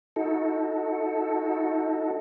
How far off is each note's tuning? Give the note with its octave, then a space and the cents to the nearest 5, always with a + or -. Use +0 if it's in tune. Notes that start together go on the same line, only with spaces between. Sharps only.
D#4 +25 F#4 -20 A4 +0